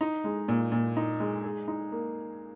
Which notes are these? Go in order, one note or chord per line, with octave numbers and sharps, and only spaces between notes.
D#4
G#3
A#2
A#2
D#4
G#3
G#4
D#4
A#3